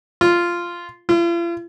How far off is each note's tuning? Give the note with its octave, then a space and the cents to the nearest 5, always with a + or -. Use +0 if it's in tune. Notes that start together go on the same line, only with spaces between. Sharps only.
F4 -10
F4 -45